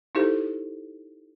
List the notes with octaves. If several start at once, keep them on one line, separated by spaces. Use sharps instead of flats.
D#4 E4 G4 A4 C5